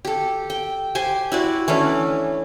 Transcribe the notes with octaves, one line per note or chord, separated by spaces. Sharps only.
G4 A4
G5
G4 C5 G#5
E4 F#4 D5
E3 A3 C#4 D4